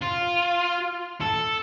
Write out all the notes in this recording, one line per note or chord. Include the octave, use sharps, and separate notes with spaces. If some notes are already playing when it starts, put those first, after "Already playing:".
F4
A4